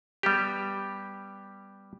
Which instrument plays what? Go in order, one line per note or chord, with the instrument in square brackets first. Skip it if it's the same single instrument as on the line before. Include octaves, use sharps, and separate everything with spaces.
[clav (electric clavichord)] G3 B3 G4